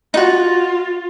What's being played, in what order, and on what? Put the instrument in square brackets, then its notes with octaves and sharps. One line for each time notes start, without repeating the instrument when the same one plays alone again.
[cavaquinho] D#4 F#4 [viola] F4